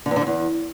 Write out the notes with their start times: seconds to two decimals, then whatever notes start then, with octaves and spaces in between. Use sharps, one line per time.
0.06 D3
0.11 E2
0.16 D3
0.21 F2
0.27 E2